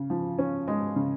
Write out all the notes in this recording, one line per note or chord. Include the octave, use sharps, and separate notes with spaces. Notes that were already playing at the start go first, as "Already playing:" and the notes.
Already playing: C#3
F3
C#4
G#3
C#3